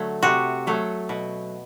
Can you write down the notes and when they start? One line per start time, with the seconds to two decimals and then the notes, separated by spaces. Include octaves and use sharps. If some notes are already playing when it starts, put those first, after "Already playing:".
Already playing: D3 F#3 A3
0.23 C3 F#4
0.67 F#3 A3
1.09 B2